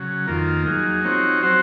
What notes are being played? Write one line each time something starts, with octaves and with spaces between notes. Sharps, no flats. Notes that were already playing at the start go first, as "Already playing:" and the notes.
Already playing: C#3 F#3
F2 D#3 A#3 F4 A#4
F#3 A#3 D#4 G#4
F3 C4 D#4 F#4 C#5
F#3 C4 F#4 C5